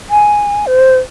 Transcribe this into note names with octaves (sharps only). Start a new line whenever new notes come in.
G#5
C5